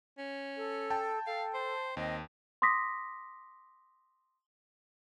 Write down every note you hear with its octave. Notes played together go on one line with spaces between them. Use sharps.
C#4
A4
G5 A5
A4 F5
C5
D#2 C4 D#5
C6 D6 D#6 A#6 B6